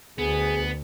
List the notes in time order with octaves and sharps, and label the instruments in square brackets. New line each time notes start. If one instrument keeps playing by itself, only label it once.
[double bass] D2 [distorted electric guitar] B3 [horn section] G#4